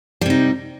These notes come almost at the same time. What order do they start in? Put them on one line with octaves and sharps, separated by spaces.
G3 C3 D#4